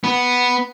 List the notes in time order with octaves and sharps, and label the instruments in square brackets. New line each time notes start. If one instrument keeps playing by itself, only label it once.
[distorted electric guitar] B3